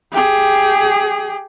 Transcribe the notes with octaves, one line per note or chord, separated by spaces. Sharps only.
G4 G#4